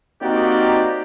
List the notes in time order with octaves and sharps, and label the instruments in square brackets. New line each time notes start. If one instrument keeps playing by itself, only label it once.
[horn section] A#3 C4 D#4 F#4 G4 D5